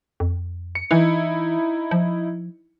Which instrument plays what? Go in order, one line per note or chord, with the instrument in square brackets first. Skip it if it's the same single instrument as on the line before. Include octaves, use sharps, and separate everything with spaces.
[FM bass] F2
[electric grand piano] C#7
[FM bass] E3 [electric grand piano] D#4 E4
[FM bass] F3